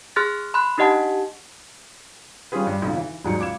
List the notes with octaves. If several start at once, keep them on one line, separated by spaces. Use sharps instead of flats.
G#4 C6 F6 F#6 A6
B5 C6 F#6
D4 D#4 G4 D#5 F#5 A5
G3 C#4 F4 G#4 B4
G2
B1 F2 C#3
E3
E1 G#2 F#3 C#7
C#2 D6 G#6 E7